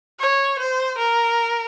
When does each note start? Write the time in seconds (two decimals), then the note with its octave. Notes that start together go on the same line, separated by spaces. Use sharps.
0.20 C#5
0.59 C5
0.98 A#4